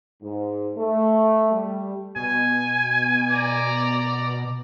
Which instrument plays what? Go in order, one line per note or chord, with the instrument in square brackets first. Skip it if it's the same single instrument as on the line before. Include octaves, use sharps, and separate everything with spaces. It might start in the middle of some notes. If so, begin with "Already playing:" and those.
[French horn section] G#2
A3
G3
[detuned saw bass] B2 [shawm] G#5
[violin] D5 A#5